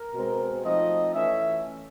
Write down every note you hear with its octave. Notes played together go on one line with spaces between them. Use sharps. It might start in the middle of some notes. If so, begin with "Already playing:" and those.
Already playing: A#4
B2 G#3 C4
F3 A3 C4 D#4 D#5
E3 A3 C#4 E5